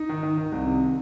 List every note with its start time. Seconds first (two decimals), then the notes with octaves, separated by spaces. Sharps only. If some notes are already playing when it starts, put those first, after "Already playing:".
Already playing: D#4
0.09 D#3
0.23 D#3
0.38 D#3
0.52 C2
0.66 C3